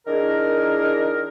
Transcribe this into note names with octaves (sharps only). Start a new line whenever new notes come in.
D#3 D4 E4 G#4 A#4